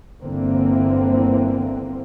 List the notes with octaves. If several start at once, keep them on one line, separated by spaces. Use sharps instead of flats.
G1 D3 E3 A#3 C4